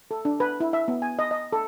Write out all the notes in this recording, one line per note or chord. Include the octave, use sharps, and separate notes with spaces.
A4
D4
B4
E4
E5
B3
G#5
D#5
D#5
A4